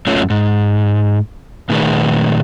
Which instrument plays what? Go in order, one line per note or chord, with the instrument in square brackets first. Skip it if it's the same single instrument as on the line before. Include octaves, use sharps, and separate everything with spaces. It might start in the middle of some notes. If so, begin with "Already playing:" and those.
[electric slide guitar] F#2 A3 C#4 F4 C#5
G#2
A#2 D#3 A3 D#4 G#4 B4